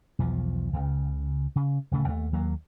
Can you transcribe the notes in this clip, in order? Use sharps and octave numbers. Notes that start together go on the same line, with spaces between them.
B1 E2 F3
C#2 C#3
C#3
D1 C#3 A3
D#2 A3
D#2 F#3 A#3